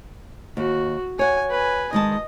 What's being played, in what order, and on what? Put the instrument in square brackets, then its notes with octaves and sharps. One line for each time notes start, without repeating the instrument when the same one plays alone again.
[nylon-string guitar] D#2 [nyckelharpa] F#4
[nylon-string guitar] C#5 F#5 [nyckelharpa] G#5
[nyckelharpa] B4 G#5
[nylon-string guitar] D#3 G#3 A5 [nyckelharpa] D#5